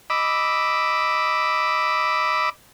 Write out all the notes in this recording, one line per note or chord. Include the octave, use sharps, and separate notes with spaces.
D#5 B5 D6 E6